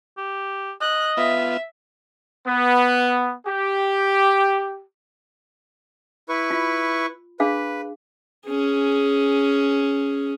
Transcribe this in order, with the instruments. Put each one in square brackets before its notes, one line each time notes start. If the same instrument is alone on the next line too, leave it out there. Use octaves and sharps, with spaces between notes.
[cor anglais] G4
[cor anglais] D#5 [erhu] F#6
[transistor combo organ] B3 F4 [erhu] E5
[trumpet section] B3
G4
[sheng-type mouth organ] E4 B4 C#6
[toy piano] F4
[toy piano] D4 G#4 F5 [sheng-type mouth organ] B4
[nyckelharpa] C#4 G#4